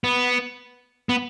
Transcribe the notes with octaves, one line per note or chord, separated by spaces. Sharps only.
B3
B3